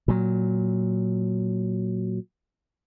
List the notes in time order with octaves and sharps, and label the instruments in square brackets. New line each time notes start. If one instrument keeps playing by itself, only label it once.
[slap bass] A#2 F#3